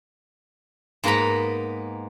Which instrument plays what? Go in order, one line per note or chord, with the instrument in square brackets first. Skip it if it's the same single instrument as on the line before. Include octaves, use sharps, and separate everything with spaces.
[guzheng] G#2 A#3 B3 B4 A#5 B5